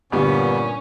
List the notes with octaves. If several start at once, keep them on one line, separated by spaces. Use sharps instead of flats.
G1 A#2 G3 B3 C#4